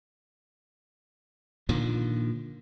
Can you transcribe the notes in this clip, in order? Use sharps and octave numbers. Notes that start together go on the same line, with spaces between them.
A#2 D3 D#3 F3